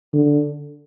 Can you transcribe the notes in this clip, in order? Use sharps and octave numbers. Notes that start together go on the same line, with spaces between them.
D3